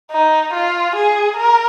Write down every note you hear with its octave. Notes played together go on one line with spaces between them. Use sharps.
D#4
F4
G#4
A#4